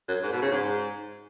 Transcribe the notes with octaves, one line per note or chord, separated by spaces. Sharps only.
F#2
G#2
B2
C#3
G#2